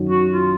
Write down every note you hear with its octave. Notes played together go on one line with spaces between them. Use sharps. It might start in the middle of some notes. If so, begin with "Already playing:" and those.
Already playing: F#2 D#3 F#3
F#4
F4